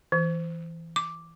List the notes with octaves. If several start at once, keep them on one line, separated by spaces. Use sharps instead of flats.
E3
D6